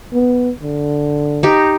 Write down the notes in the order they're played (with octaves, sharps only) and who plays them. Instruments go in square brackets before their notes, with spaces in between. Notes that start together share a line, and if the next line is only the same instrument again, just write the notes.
[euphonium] B3
D3
[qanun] D#4 G4